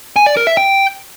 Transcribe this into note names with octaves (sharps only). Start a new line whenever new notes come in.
G#5
D5
A#4
E5
G5